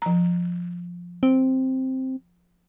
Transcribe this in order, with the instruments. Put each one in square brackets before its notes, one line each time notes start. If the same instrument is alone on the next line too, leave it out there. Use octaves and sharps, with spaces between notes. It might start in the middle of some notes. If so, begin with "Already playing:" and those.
[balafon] F3 A#5
[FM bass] C4